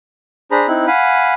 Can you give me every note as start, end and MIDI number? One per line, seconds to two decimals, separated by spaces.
0.51 0.67 62
0.51 0.67 68
0.51 0.67 72
0.51 0.67 82
0.51 0.67 83
0.68 0.86 60
0.68 0.86 63
0.68 0.86 64
0.68 0.86 90
0.87 1.34 77
0.87 1.34 78
0.87 1.34 80
0.87 1.34 83